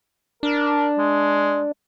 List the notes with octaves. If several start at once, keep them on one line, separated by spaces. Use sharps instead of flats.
D4 A#4
G#3